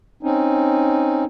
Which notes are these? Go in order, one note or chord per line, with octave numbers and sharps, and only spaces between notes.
C4 C#4 D#4